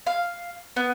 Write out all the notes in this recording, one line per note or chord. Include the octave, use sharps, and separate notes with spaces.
F5
B3